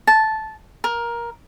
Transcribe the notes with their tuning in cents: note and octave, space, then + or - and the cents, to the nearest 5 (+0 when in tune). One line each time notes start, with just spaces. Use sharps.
A5 -10
A#4 +15